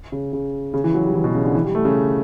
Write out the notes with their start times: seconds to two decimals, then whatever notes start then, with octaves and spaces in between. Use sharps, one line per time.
0.12 C#3
0.33 C#3
0.74 C#3
0.84 E3
0.94 F#3
1.04 G3
1.14 E3
1.24 B2
1.35 C#3
1.44 D3
1.55 E3
1.64 G3
1.75 A3
1.85 C#3